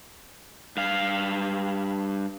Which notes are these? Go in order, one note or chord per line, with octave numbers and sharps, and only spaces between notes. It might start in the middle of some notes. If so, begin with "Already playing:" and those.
G2 F5